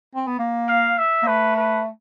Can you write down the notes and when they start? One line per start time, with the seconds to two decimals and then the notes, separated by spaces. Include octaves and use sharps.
0.15 C4
0.27 B3
0.39 A#3
0.69 F5
0.98 E5
1.23 A#3
1.27 A3 B4
1.56 B4